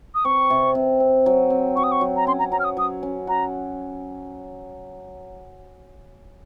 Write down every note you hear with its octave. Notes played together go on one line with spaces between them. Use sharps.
D#6
C4 C#6
C3
C3
C4
F#3
C4
F#3 C#6
D#6
C#6
F#3
A#5
C#4 C6
A#5
F#3 A#5
F6
D#6
F#3 D#6
C#4
F#4 A#5